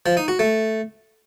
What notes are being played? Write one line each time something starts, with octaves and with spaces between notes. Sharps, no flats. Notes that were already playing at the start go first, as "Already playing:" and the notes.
F3
D#4
F#4
A3